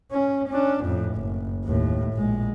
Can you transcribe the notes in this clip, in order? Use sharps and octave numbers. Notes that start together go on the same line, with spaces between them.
C#4
C#4 D4
F2 A2
F#1
D#2 A2
A#1 G#3